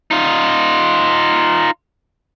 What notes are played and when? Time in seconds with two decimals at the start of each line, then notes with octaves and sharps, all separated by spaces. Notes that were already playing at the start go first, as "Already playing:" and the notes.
0.11 D#4 F4